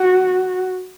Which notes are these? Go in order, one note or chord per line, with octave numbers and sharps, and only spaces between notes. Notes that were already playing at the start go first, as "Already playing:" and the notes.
Already playing: F#4